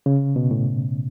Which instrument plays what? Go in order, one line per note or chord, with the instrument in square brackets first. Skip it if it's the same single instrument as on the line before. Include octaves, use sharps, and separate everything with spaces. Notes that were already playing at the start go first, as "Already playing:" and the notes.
[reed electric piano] C#3
B2
A2